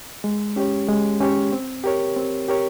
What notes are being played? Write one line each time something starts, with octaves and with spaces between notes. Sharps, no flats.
G#3
C#4 G4 C#5
G#3
C#4 G4 C#5
C4
G4 A#4 C#5
C4
G4 A#4 C#5